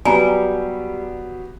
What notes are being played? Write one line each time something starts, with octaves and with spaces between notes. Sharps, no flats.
F#3 G3 B3 G4 G#5 A#5